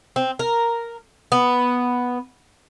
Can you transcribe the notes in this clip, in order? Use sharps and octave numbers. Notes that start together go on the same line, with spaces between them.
C4
A#4
B3